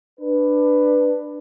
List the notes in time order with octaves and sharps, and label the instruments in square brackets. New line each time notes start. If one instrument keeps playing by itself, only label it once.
[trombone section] D4 B4